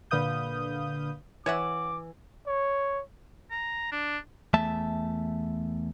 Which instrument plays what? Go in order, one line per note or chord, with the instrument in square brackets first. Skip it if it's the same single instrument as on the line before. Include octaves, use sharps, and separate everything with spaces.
[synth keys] A#2 D3 B4 F5 D#6 G6
[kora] E3 [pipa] C#5 E5 F#5 [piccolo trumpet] D6
[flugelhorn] C#5
[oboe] A#5
D4
[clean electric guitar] E2 A3 E5 A5